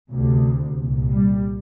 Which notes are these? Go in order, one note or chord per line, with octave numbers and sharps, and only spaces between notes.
D2 C3
C2 A#2
G3